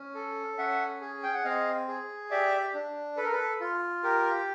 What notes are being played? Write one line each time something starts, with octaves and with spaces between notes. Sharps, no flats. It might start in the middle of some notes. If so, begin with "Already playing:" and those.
Already playing: C#4
A4
C#4 E5 F#5
G#4
G5
F#5
C4 D#5 F5
G#4
G4 D5 E5
D4
A4 B4
A#4
A4 B4
F4
G4 A#4